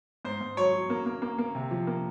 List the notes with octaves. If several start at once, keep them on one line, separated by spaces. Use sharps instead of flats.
G#2 C5
G#2
F#3 C#5
F#3
A#3
A#3
A#3
A#3
C3
F3
A#3